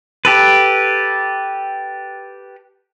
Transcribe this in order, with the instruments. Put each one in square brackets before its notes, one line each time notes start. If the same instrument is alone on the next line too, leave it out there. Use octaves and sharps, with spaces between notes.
[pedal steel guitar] G4 A4 B4